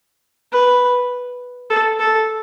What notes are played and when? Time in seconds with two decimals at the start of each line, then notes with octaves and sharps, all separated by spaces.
0.52 B4
1.70 A4
1.99 A4